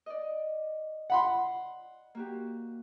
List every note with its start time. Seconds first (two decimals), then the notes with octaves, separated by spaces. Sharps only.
0.06 D5 D#5
1.10 F#5 B5 C6
2.15 A#3 F#4 G4